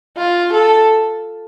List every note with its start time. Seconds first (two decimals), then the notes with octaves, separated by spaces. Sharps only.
0.18 F4
0.53 A4